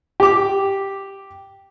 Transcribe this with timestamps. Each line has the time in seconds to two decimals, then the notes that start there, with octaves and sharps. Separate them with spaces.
0.20 G4 D6